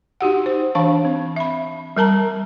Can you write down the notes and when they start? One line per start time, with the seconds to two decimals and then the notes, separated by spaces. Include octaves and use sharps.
0.21 D#4 F#4 G4 F#5
0.46 C5
0.75 E3 D4 F5 A5
1.05 C4
1.36 E5 B5
1.97 G3 A#4 A5 A#5